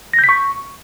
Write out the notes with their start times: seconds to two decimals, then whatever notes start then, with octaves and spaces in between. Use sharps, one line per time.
0.13 A#6
0.19 G6
0.24 B6
0.29 C#6